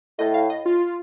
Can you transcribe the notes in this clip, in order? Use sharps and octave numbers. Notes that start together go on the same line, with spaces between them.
A2 D#5
F5
D#5
F4